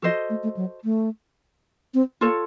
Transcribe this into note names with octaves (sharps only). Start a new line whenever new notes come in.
F3 F#4 A4 C5 D#5
A3
A3
F#3
A3
C4
A#3 F4 A4 C#5